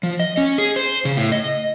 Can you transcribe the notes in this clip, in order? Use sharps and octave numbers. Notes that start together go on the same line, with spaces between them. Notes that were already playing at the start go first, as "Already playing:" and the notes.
F3
D#5
C#4
G#4
C5
C#3
A2
D#5